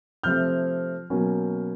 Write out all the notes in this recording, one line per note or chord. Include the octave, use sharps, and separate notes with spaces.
C3 F3 A3 C4 F6 G6
B2 F#3 A#3 C#4